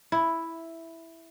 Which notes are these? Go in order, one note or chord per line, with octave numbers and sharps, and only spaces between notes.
E4